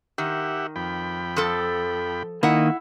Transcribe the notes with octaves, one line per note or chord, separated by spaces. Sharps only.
D#3 G4 E5 F#5
F2 G5 B5
F3 A4
D#3 A#3 E4 D#5 F#5